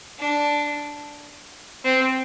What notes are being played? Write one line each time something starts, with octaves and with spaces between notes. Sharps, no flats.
D4
C4